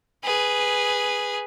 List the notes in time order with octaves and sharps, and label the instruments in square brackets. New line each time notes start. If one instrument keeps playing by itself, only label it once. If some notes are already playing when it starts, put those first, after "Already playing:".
[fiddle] G#4 B4